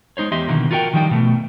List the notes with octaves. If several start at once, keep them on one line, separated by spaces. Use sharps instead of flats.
G#3 D#4 C5 C#5
E2 D#4 G4 D#5 E5 C6
B2 D3 D#3 F3 A#3
F4 F#4 A#4 C5 G5
D#3 F3 G3 D#4 G5
B2 A3